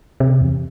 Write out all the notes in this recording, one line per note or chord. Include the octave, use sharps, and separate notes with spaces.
C3
E2